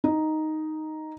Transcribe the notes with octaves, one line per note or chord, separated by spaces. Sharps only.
D#4